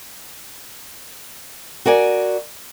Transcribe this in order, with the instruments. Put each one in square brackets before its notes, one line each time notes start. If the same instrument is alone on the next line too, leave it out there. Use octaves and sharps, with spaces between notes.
[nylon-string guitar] F#4 A#4 D5 G#5